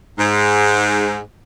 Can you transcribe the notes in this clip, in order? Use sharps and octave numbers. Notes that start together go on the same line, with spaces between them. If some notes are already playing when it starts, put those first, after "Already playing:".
G#2